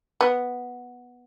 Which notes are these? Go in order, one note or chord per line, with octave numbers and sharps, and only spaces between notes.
B3